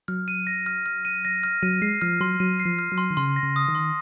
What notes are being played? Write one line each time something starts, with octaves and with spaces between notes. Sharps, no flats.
F#3 F6
D#7
A#6
F6
F6
D#7
A#6
F6
F#3 D#7
G#3 C7
F3 F6
F#3 C6
F#3 D#7
C7
F3
F6
F#3
C6
D#3
C#3 C6
A#6
C#3
D#6
D#3
C6